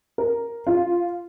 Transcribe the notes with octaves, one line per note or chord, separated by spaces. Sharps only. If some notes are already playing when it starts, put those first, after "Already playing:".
A#4
F4